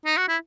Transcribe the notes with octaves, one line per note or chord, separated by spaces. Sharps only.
D#4
F#4
E4